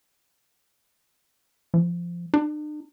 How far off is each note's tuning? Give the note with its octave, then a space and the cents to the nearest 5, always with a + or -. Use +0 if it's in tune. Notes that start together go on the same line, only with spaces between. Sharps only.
F3 -15
D4 +45